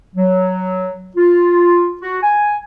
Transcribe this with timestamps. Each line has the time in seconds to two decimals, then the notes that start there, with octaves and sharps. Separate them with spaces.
0.15 F#3
1.16 F4
2.01 F#4
2.22 G#5